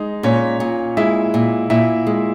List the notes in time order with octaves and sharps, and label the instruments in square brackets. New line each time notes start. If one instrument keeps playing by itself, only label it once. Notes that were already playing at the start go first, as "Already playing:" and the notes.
Already playing: [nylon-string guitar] G#3 [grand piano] D#4
[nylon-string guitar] A#2 [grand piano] C#4 C#5
[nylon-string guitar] A#2
[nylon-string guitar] G#3 [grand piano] E4 E5
[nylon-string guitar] A#2
[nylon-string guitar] A#2 [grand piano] E4 E5
[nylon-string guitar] G#3